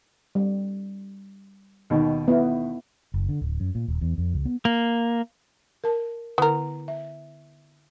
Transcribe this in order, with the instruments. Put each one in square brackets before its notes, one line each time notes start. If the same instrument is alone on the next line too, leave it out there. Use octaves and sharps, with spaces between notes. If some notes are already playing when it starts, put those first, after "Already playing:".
[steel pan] G3
[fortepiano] D#2 B2 D#3
[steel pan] B3 E4
[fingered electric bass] F#1
D3
D1
F#2
A#2
D#1
E2
F2
C#2
B3
[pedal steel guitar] A#3
[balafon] A#4 A5
[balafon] D3 E4 [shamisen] B3 A#4
[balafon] E5